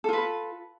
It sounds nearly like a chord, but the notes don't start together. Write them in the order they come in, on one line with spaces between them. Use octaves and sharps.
A4 F4 B4